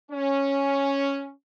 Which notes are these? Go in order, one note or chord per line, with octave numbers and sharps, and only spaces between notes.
C#4